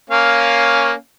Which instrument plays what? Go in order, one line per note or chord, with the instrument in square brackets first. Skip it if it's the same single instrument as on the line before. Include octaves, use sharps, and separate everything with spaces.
[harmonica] A#3 C#4 F5